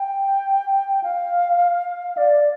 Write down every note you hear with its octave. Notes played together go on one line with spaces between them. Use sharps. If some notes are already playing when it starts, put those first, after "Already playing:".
Already playing: G5
F5
D5